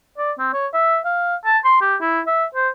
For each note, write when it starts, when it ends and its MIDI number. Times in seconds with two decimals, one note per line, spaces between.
0.18 0.32 74
0.39 0.51 60
0.53 0.67 73
0.74 0.99 76
1.05 1.36 77
1.45 1.58 81
1.65 1.78 84
1.81 1.96 67
2.01 2.21 64
2.27 2.44 76
2.55 2.69 72